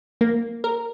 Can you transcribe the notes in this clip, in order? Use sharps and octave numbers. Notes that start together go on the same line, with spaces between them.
A#3
A#4